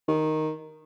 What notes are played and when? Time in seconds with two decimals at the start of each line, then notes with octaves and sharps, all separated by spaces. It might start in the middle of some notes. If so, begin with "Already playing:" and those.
0.08 D#3